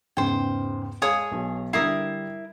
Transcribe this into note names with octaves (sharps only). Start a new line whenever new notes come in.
E2 G#2 C#3 C5 G5
G#3 G#4 C#5 F5 D#6
B1
D3 G3 E4 A#4 D#6 C7